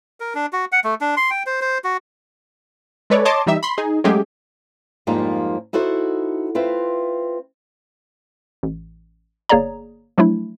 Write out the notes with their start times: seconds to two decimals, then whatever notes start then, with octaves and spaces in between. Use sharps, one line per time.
0.20 A#4
0.35 D4
0.53 F#4
0.72 F#5
0.84 A3
1.01 D4
1.17 C6
1.30 G5
1.46 C5
1.61 C5
1.84 F#4
3.10 G#3 A4 B4 C#5 D5
3.25 C#5 D#5 A5 C6 D6
3.46 E3 G3 D#4 E5
3.63 B5 C6
3.78 D#4 G#4
4.04 F#3 G#3 A3 C#4 G4 G#4
5.07 F2 G#2 F3 G3 A#3 D#4
5.73 D#4 E4 F#4 A4 C5
6.55 C4 F4 B4 E5
8.63 A1
9.49 G1 A#3 G#4 C#5 D5 A#5
10.18 F3 F#3 A3 D4 E4